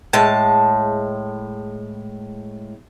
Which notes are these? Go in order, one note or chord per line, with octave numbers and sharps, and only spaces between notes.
A2 G#3 A5